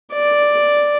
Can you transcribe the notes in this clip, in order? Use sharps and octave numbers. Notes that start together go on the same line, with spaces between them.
D5